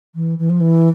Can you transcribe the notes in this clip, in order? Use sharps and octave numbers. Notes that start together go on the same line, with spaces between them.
E3
E3
F3
E3